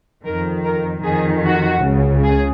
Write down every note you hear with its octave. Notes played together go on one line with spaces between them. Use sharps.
F2 D#3 A#4
A#4
F2 D#3 G#4
F#4
C#2 C#3
G#4